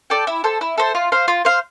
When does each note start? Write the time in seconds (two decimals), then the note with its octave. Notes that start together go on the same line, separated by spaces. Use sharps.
0.10 A4 D5 G5
0.27 E4
0.44 A4 C5
0.61 E4
0.78 A4 C5
0.95 F4
1.12 C5 F5
1.28 F4
1.45 C5 F5